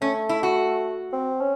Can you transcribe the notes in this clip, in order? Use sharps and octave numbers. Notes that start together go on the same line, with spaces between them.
A3 C#4
E4
F#4
C4
C#4